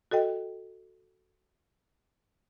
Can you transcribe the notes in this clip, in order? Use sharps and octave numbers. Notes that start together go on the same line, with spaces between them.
F#4 A4 D#5 G5